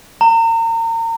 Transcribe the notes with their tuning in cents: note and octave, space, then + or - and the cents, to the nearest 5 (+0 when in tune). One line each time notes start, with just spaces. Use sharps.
A#5 -35